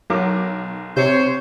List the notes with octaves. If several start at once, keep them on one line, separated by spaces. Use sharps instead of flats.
B1 F#3 A#4 D6
C3 C5 C#5